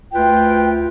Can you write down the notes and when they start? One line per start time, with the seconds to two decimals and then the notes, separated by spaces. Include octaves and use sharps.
0.14 D2 F4 B4 G5